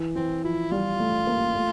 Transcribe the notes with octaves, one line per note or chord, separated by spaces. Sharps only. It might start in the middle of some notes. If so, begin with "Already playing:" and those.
Already playing: E3
E3 C4
F3 E4
G3 F4
A3
A#3
A3